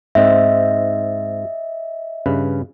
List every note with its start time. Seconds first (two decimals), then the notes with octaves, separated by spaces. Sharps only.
0.15 G#2 C4 D#5 E5
2.26 G2 C#3 B4